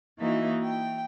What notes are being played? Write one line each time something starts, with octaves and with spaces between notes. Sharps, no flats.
E3 A#3 D#4 F#4 D#5 E5
G5